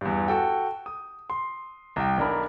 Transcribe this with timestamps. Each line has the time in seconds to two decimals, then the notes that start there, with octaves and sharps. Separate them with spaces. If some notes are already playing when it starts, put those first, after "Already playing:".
0.01 E2 G2
0.28 F#4 A4 G5
0.86 D#6
1.30 C6
1.96 C2 G5
2.18 B1 D4 A#4 B5